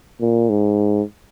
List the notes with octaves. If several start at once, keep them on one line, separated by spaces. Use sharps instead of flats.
A#2
G#2